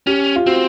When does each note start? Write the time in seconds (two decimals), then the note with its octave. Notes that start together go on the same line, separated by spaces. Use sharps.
0.07 C#4 G4
0.36 F4
0.47 C4 F#4